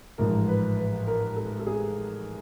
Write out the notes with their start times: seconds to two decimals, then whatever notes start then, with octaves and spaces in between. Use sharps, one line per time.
0.18 A1 G#2 F3 A#4
0.48 B4
0.77 B4
1.07 A#4
1.36 A4
1.60 A4
1.67 G#4